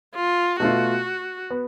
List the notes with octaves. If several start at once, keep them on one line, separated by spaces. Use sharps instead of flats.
F4
B2 A3 F4 F#4
B3